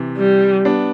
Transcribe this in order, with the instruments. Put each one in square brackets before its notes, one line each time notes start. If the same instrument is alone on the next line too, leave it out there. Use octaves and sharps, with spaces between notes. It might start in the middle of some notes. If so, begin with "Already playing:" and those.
Already playing: [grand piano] C3 E3
[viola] G3
[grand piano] B3 D4